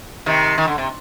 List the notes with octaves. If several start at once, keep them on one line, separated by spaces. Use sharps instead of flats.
C3 D#3
D#3
D3
C3